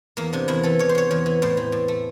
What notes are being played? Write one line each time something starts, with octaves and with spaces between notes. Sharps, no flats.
E2 A#3
C3 D4
E2 E4
E3 A4
E2 C#5
C5
C3 C#5
E2 C#5
E3
A2 C5
E3
A2
A3